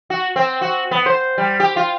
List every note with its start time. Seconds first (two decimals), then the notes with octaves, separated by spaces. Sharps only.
0.10 F#4
0.36 C4
0.62 F#4
0.91 B3
1.06 C5
1.38 G3
1.60 G4
1.76 F4